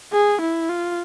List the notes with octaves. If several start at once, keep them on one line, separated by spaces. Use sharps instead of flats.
G#4
E4
F4